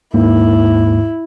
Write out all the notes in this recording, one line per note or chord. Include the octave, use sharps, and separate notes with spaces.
D#2 G#2 A#3 E4